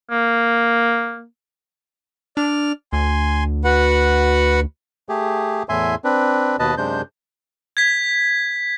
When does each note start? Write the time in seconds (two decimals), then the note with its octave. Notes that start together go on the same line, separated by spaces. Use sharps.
0.11 A#3
2.37 D4 D5 F6
2.93 D2 G#5 C6
3.64 F#4 B4 F#5
5.09 A3 G4 G#4
5.69 E2 A2 E5 G#5 C6
6.04 C4 D4 B4
6.59 D#2 B2 B4 D#5 A5
6.77 F#2 C3 G#3 D4 C5 G6
7.77 G#6 B6